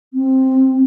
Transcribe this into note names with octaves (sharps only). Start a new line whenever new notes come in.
C4